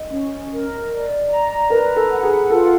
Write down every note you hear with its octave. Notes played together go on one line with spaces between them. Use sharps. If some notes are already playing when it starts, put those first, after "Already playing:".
Already playing: D#5
C#4
A#4
D5
A#5
A#4 B4
A4
F#5
G#4
F4 A4